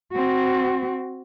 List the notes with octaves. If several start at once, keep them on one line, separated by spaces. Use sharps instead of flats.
C4 F#4